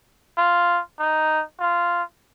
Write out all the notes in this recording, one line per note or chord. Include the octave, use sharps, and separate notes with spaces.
F4
D#4
F4